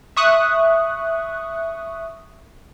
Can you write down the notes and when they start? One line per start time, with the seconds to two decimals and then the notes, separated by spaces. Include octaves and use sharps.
0.16 E5 C#6 D#6 F#6